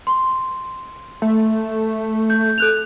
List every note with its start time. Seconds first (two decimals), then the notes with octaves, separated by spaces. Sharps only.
0.07 C6
1.22 A3
2.30 G6
2.58 A4 F#6 F7